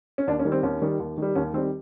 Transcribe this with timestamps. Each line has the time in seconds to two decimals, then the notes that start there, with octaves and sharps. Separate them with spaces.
0.18 C#4
0.27 D#2 D4
0.39 C#4
0.45 D#3 G3
0.52 C4
0.63 D#2 C#4
0.82 D#3 G3
1.00 D#2
1.18 D#3 G3
1.35 D#2 C#4
1.54 D#3 C4
1.57 G3